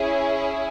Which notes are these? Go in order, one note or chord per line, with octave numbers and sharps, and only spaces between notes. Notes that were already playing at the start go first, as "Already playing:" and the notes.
Already playing: C#4 E4 G#4